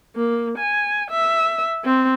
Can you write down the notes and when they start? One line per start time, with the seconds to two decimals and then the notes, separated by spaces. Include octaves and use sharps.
0.16 A#3
0.58 G#5
1.11 E5
1.85 C4